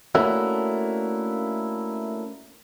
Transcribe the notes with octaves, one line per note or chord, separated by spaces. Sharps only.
A3 A#3 C#4 D4 E4 F#4